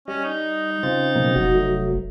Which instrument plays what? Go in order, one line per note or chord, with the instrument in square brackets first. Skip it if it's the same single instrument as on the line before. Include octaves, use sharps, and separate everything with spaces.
[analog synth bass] G3 [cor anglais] C#4 [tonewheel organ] D#5
[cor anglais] D#4
[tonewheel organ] C#3 C4 A6 [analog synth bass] F4
[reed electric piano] B2 F#3 [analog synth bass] A#3
[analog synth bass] F1 [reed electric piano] F#4
[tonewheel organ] F#3 A3